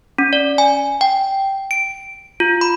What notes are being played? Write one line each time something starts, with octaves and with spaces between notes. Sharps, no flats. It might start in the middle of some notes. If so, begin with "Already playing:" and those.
C#4
D5
G#5
G5
D7
F4
B5